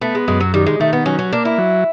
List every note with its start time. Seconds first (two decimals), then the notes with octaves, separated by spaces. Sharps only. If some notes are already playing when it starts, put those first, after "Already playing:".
0.02 A3 B3
0.15 G#3
0.28 F#2 G#3
0.41 F#3
0.54 D#3 G3
0.66 G#3
0.80 D#3 A3
0.93 B3
1.06 F#3 C#4
1.19 C#4
1.33 A#3 D4
1.45 E4
1.58 F#3